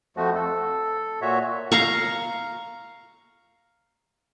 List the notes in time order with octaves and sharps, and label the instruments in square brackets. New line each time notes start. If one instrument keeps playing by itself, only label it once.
[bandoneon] F2 F3 A3 F#4
A4
A#2 F#4 C#5 E5
[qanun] F5 A#5 C#6